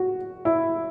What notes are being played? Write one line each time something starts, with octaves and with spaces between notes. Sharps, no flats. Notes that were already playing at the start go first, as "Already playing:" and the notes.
Already playing: F#4
E4